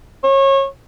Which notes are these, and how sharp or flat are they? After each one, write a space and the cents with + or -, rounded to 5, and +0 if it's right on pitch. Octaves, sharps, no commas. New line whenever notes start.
C#5 -25